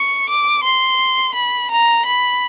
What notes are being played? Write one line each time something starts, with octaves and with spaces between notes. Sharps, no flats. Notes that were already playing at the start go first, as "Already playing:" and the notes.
Already playing: C#6
D6
C6
B5
A#5
B5